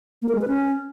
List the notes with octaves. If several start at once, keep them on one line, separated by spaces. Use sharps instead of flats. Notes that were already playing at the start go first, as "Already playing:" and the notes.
A#3
A#4
G#3
B4
C#4